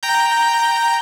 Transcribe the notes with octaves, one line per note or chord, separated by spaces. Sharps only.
G5 A#5 G6